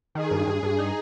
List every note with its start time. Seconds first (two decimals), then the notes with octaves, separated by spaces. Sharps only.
0.14 D#3 G#4
0.31 G2
0.47 G2
0.63 G2
0.79 D#4